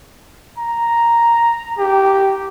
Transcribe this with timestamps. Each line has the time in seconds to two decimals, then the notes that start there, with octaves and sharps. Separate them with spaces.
0.58 A#5
1.78 G4